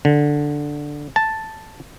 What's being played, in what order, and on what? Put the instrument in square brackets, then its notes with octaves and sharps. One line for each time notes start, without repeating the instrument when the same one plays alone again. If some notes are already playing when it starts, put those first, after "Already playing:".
[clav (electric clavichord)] D3
A5